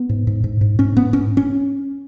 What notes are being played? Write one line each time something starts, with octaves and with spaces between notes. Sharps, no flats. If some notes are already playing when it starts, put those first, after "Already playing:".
Already playing: B3
G#2
G#2
G#2
G#2
G#2 C#4
G#2 B3
G#2 C#4
C#4